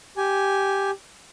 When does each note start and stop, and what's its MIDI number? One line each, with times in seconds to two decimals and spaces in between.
0.17 0.91 67
0.17 0.91 80